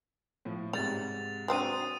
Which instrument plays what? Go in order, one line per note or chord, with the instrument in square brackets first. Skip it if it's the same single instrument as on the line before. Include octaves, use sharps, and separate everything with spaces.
[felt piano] A2 F3
[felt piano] G#2 C3 [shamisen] G3 [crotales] A6 F7
[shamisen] F#3 C4 D4 [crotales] D#6 D#7